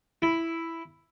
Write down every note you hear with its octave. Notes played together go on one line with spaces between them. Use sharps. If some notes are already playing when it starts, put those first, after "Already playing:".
E4